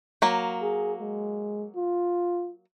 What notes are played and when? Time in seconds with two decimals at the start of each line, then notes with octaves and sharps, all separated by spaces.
0.22 F#3 A#3
0.62 G#4
1.00 G#3
1.75 F4